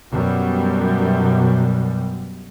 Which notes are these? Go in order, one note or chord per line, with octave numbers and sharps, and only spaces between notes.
F#2 B2 G3